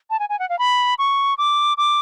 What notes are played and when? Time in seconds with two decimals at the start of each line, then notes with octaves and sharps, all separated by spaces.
0.10 A5
0.19 G#5
0.29 G#5
0.39 F#5
0.49 F5
0.59 B5
0.98 C#6
1.38 D6
1.77 D6